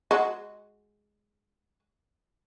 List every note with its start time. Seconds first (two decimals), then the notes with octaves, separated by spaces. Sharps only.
0.11 G#3 F#4